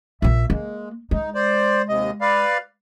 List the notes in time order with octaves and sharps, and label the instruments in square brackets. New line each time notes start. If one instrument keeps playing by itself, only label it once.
[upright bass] A#1 A#2 [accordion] E5
[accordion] G#3 [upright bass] A#3
[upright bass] G#3 [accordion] D#4
[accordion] C5 D5
D#2 C3 D#5
B4 D5 F5